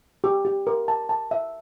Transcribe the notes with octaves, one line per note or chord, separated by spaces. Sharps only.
G4
G4
A#4
A5
A5
E5